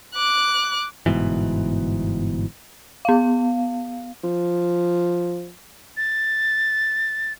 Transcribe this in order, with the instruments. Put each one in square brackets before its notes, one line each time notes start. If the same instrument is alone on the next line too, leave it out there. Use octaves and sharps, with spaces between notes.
[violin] D6 F#6
[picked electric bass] G1 G#2 B2 E3
[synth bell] B3 F5
[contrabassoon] F3
[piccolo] A6